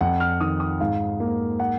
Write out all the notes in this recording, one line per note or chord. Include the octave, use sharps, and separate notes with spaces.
F2 F#5
F6
D#3 D#6
D#6
G#2 F5
A#3
F#5